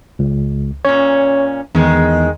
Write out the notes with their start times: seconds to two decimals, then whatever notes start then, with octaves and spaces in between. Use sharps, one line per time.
0.19 C#2
0.85 A#2 C#4 C#5
1.75 E2 D#3 G#3